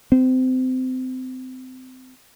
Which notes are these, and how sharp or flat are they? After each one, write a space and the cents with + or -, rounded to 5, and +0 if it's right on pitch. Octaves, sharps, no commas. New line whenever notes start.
C4 -25